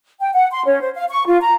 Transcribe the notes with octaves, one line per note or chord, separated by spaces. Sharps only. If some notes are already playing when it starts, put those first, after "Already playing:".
G5
F#5
C6
C#4
C5
F5
C#6
F4
A#5